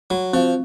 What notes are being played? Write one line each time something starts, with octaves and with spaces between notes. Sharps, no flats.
F#3 F#4
F3 C4